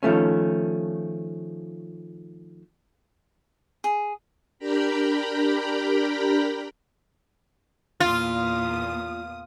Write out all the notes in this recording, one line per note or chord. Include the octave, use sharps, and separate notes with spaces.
D#3 F3 A3 C#4
G#4
D4 G4 A#4 G5 A#5 B5
E2 A#2 F4 D#6